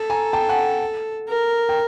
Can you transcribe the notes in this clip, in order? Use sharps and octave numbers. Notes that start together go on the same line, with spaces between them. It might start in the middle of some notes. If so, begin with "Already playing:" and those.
Already playing: A4
G#5 A#5
G5 A5
F#5 G#5
A#4
G5